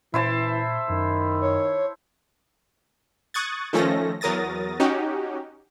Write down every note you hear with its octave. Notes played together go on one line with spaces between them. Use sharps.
A#2 E3 E4 C5 A5
F#2 D#3
C#5
C#6 D#6 F#6 G#6 A6
D#3 F3 A3 C#4 A4 A#6
E2 F#3 A#4 D#6 A6 A#6
C#4 D#4 F#4 G4